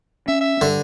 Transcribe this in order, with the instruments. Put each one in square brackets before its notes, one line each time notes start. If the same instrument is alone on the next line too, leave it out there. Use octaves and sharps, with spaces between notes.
[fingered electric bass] C#4 [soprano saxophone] E5
[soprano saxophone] E5
[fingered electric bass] G2 [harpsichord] D3